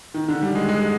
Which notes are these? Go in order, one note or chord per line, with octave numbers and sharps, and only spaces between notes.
D#3
D3
G3
G#3
G#3